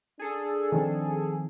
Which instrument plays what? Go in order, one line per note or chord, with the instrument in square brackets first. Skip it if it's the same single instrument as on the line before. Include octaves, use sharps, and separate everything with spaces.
[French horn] D4 [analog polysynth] G#4 A4
[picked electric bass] D#3 F3 C4